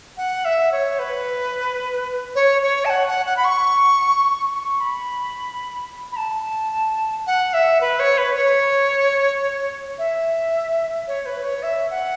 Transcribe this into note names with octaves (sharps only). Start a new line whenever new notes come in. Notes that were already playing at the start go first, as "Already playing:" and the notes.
F#5
E5
C#5
B4
C#5
C#5
A5
F#5
F#5
F#5
B5
C#6
C#6
B5
B5
A5
F#5
E5
B4
C#5
B4
C#5
E5
C#5
B4
C#5
E5
F#5